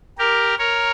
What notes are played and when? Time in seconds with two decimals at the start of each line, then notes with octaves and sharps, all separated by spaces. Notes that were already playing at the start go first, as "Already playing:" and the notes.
0.18 G4 A#4
0.58 A#4 C#5